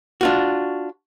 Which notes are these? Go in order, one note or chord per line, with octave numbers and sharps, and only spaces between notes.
D4 F4 F#4